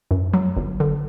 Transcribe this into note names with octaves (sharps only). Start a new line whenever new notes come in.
F#2
F#3
G1
D3